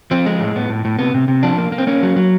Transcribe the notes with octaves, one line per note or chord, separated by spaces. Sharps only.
F3 C4
G#3
A2
A2 B3
A2
A2
C3 B3
C3
C3
F3 D4
A#3
A#3
C4
A#3 C#4
F#3
F#3